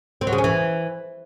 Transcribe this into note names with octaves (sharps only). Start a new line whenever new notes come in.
C4
F#3
C#3
C#4
E3